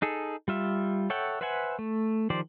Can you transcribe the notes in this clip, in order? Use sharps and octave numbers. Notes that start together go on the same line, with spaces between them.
D#4 G#4 A4
G3 F4 E5
A4 C#5 E5 F#5 G5
B4 C5 E5 F#5 G#5
A3
D#3 F3 G4 C5 D5